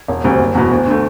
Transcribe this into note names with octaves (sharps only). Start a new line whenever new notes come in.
E1
D2 C3 G3
F#1
E2 B2
D2
D3 A3